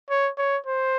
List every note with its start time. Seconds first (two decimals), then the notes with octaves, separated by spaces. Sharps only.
0.10 C#5
0.38 C#5
0.67 C5